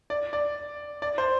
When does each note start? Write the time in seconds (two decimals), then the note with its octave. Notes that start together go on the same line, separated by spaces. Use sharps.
0.10 D5
0.33 D5
1.02 D5
1.18 C5